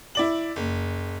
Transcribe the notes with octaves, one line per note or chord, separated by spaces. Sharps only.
E4 D5 F#7
F#1